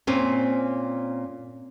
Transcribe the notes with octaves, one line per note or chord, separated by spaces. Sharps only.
A#2 C4 C#4